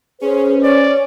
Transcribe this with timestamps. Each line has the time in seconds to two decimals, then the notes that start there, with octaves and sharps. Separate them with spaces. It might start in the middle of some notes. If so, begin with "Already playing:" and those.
0.21 C#4 G#4 B4 C5
0.63 C#5 D5